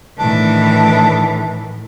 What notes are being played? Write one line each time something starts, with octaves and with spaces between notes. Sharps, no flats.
A2 D#3 E3 D4